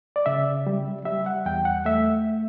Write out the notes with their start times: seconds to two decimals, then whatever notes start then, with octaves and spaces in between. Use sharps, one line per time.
0.16 D5
0.26 C#3 E5
0.67 G3
1.05 G3 E5
1.26 F#5
1.46 E2 G5
1.65 F#5
1.85 A3 E5